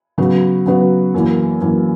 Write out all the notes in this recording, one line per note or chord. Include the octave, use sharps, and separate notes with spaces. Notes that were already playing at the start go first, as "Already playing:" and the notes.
C#3 F#3 B3 F#4 B4
C#3 F#3 B3 F#4 B4
F#2 E3 A#3
F#2 E3 A#3